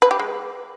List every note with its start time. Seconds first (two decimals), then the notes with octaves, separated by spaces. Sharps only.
0.02 B4
0.11 G4
0.19 G#3